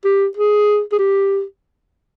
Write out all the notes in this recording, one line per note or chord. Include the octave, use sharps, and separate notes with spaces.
G4
G#4
G#4
G4